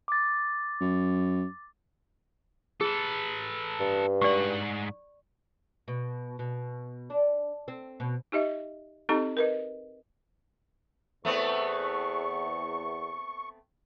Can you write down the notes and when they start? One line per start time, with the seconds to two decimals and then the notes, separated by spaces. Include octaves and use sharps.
0.08 D6 A6
0.81 F#2
2.81 G#4 A4 B4
3.80 G2
4.22 G#2 D5 F#5 C#6
5.88 B2
6.39 B2
7.10 D4
7.68 C4
8.00 B2
8.32 D#4 G4 D#5 E5
9.09 C4 D#4 G4 A4 D#5 A#5
9.37 A#4 B4 D#5
11.25 E2 A3 B3 C4 C#6